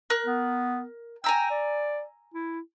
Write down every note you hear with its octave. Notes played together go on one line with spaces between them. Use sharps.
A#4 F#6
B3
G5 G#5 A#5 E6
D5
E4